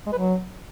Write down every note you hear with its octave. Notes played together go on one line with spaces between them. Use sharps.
G#3
B4
F#3